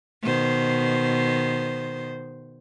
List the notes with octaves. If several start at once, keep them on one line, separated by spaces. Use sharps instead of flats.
B2 D#3 C5